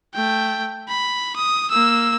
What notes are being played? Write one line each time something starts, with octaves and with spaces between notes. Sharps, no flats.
A3 G5
B5
D#6
A#3 E6